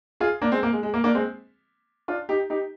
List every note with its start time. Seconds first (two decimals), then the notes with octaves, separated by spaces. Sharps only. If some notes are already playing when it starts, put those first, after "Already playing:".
0.20 F4 G#4
0.42 A#3 D4
0.52 G#3 C4
0.63 A#3
0.73 G#3
0.83 G#3
0.94 A#3
1.04 A#3 D4
1.15 G#3 C4
2.08 D4 F4
2.29 D#4 G4
2.50 D#4 G4